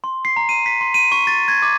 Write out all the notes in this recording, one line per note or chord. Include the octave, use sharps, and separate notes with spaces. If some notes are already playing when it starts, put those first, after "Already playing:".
C6
C7
A#5
D#7
B6
C6
D#7
C#6
A6
G#6
D6